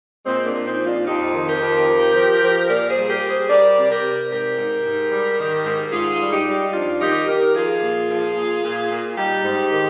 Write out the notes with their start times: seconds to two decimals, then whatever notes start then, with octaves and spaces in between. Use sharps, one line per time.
0.25 A#2 G#3 C4
0.46 A#3 D4
0.52 A#2
0.65 C4 D#4
0.79 F3
0.85 D4 F4
1.06 F2 D#4 G4
1.33 D#3
1.47 G4 A#4
1.60 F2
1.87 F3
2.14 F3
2.42 F3
2.68 A#2 A#4 D5
2.88 G#4 C5
2.96 G3
3.08 G4 A#4
3.22 G3
3.29 G#4 C5
3.49 G3 A#4 D5
3.77 C3
3.90 G4 A#4
4.03 C3
4.30 G#2 G4 A#4
4.57 G#2
4.85 G#2
5.12 G3
5.39 D#3
5.65 G#2
5.92 G#2 F4 G#4
6.20 G3
6.32 D#4 G4
6.46 G3
6.73 F2 D4 F4
7.00 D#3 D#4 G4
7.28 D#3 G4 A#4
7.55 F3 F4 G#4
7.82 A#2
8.09 F3
8.36 A#2
8.63 A#2
8.90 A#2
9.17 G3 D#4 G4
9.43 G#2
9.71 D#3